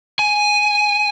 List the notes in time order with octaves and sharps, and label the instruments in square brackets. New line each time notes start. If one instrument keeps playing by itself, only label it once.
[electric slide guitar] G#5